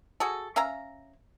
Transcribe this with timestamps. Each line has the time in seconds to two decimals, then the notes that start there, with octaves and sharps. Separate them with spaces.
0.20 F#4 G#4 A4
0.56 C#4 E5 F5 A#5